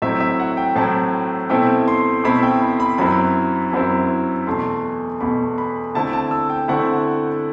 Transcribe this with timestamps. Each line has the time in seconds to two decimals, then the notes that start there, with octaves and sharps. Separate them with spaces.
0.02 A2 F#3 C4 E4 E5
0.20 E5
0.40 F#5
0.57 G5
0.76 A2 F#3 C4 E4 A5
1.50 B2 A3 C4 E4 G5
1.88 C6
2.24 B2 A3 C4 E4 B5
2.43 G5
2.62 B5
2.80 B5
2.98 F#2 F#3 C4 E4 B5
3.72 F#2 F#3 C4 E4 B5
4.47 E2 B2 A3 C6
5.21 E2 B2 A3 B5
5.58 B5
5.94 D3 A3 C4 E4 A5
6.13 A5
6.31 E6
6.50 G5
6.68 D3 A3 C4 E4 F#5